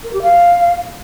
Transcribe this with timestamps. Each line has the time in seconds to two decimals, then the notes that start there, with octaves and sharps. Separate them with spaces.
0.04 A#4
0.13 G4
0.22 F5